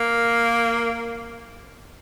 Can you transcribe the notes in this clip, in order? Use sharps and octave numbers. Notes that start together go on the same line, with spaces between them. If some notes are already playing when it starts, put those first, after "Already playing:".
Already playing: A#3